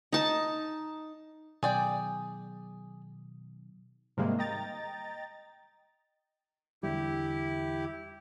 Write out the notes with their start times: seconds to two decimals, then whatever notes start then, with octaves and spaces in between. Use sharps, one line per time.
0.13 D#4 A5
1.63 B2 D#3 F#3 G#4 D5 G5
4.17 G#2 C3 D#3 G3 G#3 A#3
4.39 D#5 G5 A#5 A6
6.83 E2 D3 G3 E4 G4